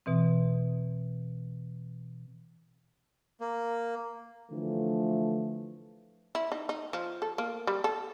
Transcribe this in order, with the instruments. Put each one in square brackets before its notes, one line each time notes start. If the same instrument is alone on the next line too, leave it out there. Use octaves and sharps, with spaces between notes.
[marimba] B2 E3 C4
[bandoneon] A#3
[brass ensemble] D3 E3 F3 A3
[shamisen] E4
D#4
D#4
F3
A4
A#3
G3
A4